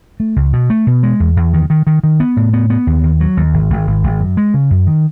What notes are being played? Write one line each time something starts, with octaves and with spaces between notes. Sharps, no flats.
A3
C#2
B2
A3
B2
G#3
E2
E2
D#3
D#3
D#3
D#3
B3
A2
B3
B3
D#2
D#2
F#3
D#2
G#1
G#1
G#1
G#1
F#2
G#3
C#3
F#2
D#3